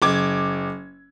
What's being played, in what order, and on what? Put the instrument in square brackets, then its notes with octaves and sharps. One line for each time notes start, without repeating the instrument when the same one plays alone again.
[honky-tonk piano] F#1 D6 G#6